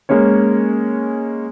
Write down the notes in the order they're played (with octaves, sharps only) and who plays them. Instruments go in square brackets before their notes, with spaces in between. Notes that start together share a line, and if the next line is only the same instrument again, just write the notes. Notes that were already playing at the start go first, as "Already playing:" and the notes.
[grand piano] G#3 A#3 C#4 C#5